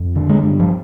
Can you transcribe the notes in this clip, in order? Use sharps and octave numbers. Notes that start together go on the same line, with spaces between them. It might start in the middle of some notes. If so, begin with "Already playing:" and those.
Already playing: F2
D3
G#3
G2
F3